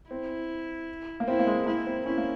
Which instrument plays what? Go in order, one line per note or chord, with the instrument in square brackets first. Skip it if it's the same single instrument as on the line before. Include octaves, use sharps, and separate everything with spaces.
[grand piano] C4 [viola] E4
[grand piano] A#3
[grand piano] C4 [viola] E4
[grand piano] A#3
G#3
[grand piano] A#3 [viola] E4
[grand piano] C4
[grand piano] C#4 [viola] E4
[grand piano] A#3